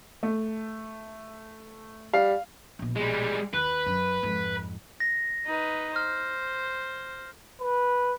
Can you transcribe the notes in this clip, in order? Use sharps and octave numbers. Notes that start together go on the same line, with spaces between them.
A3
G3 F5
A#1 B2
G3 G#3
D#2 B4
F#2
F2 G#2
A#6
D#4 B4
C5 F6
B4